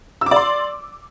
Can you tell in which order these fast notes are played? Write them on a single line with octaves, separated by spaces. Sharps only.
E6 D6 D5 C6